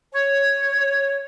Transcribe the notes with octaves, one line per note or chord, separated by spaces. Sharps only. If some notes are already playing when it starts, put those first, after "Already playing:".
C#5